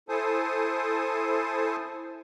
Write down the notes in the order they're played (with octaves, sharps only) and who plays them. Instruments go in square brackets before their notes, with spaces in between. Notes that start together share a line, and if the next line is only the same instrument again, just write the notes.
[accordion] E4 A4 C5 G#5 A5 D#6